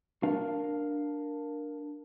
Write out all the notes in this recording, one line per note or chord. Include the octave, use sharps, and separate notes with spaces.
D4 A#4 F5